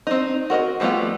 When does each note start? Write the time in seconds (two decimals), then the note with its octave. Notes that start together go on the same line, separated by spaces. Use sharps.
0.07 C4 D4 D#4
0.50 F#4 A#4 D5 D#5
0.80 F3 G3 A3 B3 F4